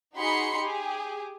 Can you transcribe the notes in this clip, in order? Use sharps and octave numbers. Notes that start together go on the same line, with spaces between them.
D#4 F#4 G#4 B5 C6 C#7
G4 G#4